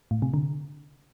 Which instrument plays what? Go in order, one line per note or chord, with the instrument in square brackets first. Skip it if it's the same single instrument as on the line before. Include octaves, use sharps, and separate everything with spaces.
[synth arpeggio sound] A2
C3
D3